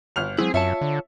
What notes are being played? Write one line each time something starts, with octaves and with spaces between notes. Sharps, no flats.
G1 F6 F7
F#3 G#3 C4 E4 G#4
F#2 F4 C#5 E5 A5
D3